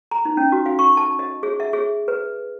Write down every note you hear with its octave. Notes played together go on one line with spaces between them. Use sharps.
A#5
D#4
C#4
F#4
F5
C#6
A5
D#5
G#4
E5
G#4
B4